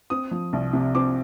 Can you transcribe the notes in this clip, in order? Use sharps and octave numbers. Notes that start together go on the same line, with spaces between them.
C4 D#6
F3
C2
C3
C4 D6